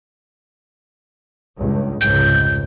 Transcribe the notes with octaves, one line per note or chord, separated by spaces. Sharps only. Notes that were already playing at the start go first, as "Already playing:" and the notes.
C#2 G2
F1 C#2 G#2 G6